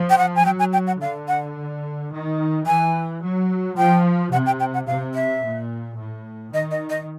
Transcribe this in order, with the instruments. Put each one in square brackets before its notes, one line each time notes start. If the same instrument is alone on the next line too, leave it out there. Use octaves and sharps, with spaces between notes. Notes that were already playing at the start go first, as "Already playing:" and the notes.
Already playing: [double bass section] F3
[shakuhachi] G5
F#5
G#5
[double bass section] F#3 [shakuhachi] G5
[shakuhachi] G#5
G5
F#5
[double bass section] D3 [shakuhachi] F5
[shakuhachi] F#5
[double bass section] D#3
[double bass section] E3 [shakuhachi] G#5
[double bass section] F#3
[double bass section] F3 [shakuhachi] G5
[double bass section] C3 [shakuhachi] F#5
[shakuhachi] G5
G5
F#5
[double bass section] C3 [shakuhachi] F5
[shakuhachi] E5
[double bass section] A#2
A2
[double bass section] D#3 [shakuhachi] D#5
[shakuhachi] D#5
D#5